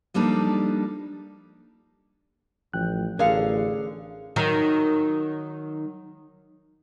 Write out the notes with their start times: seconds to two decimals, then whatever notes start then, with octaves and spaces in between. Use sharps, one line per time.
0.14 F3 G3 A#3 D4 D#4 A4
2.73 A1 F3 G5 F#6
3.19 A1 D3 G#4 A#4 F5 C#7
4.36 D#3 F#3